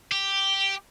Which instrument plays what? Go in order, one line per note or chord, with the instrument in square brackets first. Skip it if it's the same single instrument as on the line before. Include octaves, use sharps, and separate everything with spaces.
[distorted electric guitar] G4